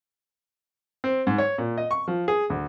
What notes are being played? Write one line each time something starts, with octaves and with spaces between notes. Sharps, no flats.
C4
G#2
C#5
A#2
D#5
C#6
F3
G#4
D2